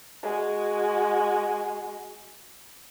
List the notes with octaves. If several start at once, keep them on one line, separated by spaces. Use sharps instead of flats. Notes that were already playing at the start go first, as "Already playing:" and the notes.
G#3 F#4